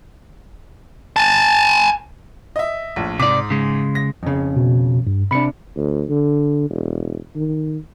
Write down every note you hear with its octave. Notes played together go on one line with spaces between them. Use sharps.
G#5 A5
D#5 E5
A#1 A2
G#2 C3 D5 D6
C#3 G#3
A#6
F2 C#3
B2
G2
C3 D4 B5 C#7
D2
D3
E1
D#3